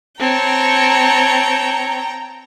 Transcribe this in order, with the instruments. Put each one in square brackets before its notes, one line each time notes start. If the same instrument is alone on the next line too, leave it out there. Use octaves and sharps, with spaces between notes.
[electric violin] C4 C#5 [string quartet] G5 A#5 [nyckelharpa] A5